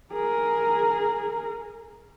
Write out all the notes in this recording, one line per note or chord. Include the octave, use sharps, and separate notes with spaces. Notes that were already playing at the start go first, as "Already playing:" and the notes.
G#4 A#4